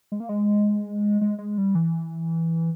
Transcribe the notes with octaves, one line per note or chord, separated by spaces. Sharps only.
G#3
A#3
G#3
G#3
G#3
G3
E3